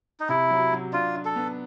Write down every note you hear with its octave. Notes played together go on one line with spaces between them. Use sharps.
D#4
C3 E4
F#3
F#3
D4 F4
D4
A4
B3